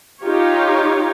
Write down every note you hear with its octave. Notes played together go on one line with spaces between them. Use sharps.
D#4 F4 G4 C#5